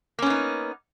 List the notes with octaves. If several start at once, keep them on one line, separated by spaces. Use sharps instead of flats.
A#3 B3 C#4 D#4